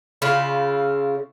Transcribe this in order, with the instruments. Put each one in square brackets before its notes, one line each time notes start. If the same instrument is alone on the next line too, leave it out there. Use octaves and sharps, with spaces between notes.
[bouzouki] C#3 E4 F4